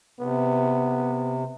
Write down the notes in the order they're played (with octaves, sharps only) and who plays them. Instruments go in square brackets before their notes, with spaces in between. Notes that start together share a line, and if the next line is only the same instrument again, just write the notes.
[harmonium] C3 [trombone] B3